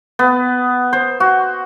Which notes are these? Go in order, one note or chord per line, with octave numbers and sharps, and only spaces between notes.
B3
C5
F#4